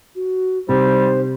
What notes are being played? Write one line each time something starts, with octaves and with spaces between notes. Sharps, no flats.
F#4
C3 G3 D#4 C5